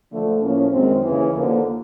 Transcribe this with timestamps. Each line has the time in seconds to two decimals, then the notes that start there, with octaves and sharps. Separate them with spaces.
0.11 D3 F3 A3
0.42 A2 F3 A#3 C#4
0.72 F#2 D#3 G#3 C4
1.04 D#2 C#3 E3
1.35 D#2 D3 F3 A#3